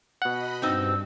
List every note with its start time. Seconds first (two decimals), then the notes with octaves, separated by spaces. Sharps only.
0.22 B2 D#5 F#5 B5
0.62 G2 C4 D#4 E6